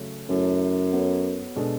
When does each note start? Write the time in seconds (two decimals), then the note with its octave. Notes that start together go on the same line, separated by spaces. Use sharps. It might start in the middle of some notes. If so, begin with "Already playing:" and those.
Already playing: C#3 F#3 A3 C#4 G#4
0.29 F#2 F#3 A3 E4 A4 C#5
0.92 B3 F#4 A4 C#5
1.56 B2 G#3 D4 A4